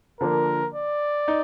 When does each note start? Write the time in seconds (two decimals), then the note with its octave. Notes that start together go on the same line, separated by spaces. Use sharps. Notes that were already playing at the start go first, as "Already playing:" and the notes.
0.21 D3 F3 A#3 D4 A#4
0.74 D5
1.28 D#4